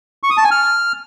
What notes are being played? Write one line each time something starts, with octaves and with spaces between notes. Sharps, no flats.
C#6
D#6
A5
G#5
F6